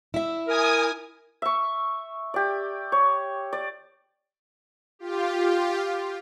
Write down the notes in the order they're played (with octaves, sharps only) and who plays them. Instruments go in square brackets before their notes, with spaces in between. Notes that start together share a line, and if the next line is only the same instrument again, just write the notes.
[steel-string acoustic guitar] E4 E5
[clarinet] A#4 [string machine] G#5 D#6
[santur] E5 C#6
G4 D5
C#5
D5
[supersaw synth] F4 G4